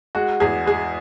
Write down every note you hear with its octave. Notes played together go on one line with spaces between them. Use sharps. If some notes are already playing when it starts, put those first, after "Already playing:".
G#3 F#4
E2 G#4
G#3 G#4